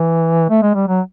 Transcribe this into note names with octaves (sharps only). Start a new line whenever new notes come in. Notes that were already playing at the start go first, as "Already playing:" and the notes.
Already playing: E3
A3
G#3
G3
F#3